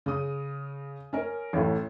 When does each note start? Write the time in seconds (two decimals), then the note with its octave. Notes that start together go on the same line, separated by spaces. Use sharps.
0.06 C#3 D#6
1.13 C#4 A#4
1.53 A1 A2